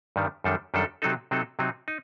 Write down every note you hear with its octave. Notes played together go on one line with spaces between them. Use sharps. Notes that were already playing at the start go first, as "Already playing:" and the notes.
G2 D#3 G3
F#2 D#3 G3 D4 A4
F#2 D#3 G3 D4 A4
C3 F#3 C4 D#4 A4
C3 F#3 C4 D#4 A4
C3 F#3 C4 D#4
D#4